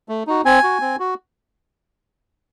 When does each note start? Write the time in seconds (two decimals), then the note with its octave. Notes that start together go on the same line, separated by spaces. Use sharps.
0.09 A3
0.27 D#4 F#4
0.45 C4 G#5
0.64 F#4
0.81 C4
1.00 F#4